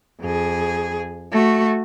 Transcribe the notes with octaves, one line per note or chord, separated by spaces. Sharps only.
F2 G#4
A3 F#4